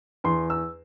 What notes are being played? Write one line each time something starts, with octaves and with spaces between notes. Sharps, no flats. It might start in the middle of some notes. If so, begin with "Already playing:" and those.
E2 C6
E6